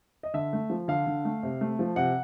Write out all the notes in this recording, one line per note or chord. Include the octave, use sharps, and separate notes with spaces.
D#5
D3 E5
A3
F3
D3 F5
D3
A3
C3
A3
F3
C3 F#5